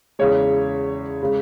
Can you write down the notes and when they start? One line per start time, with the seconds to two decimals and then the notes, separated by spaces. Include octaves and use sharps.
0.19 E2 C#3 G#3 C#5
1.23 C#3 G#3